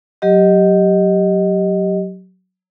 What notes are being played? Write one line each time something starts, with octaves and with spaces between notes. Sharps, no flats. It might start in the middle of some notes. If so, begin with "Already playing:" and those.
F#3 G4 D#5